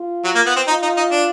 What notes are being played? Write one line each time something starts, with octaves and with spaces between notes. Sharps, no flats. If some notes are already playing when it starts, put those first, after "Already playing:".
Already playing: F4
F#3
A#3
B3
C4
D#4 F4
D#4
D#4
D4